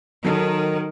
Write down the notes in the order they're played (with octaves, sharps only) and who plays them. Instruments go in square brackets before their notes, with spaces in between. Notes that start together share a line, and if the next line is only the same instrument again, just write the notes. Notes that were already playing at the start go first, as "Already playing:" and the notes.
[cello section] D#3 [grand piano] F#3 A4 A#4